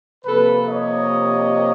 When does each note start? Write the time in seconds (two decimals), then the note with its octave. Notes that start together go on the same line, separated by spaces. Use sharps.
0.25 C3 F3 A#3 A4 B4
0.68 C#5 D#5